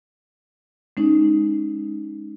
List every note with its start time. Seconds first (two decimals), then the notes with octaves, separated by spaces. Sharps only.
0.97 G#3 C#4 D#4